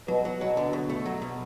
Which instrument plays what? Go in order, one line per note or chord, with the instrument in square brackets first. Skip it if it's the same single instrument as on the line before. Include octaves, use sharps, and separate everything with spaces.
[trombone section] B2 [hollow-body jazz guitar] F#3
[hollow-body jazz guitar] F#3
[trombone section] B2 [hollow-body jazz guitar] F#3
[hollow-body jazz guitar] D3
B2
A3
F#3
B2